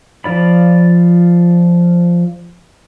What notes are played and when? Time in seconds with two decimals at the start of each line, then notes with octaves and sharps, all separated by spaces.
0.24 F3 F4 D5 B5